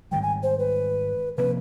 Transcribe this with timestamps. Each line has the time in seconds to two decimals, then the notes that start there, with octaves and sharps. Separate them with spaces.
0.11 G#2 D#3 G3 G5
0.22 G#5
0.43 C5
0.59 B4
1.37 C3 F3 A#3 B4